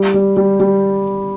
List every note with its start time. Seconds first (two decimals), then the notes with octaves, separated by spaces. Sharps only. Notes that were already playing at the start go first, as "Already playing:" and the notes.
Already playing: G3
0.14 G3
0.37 G3
0.60 G3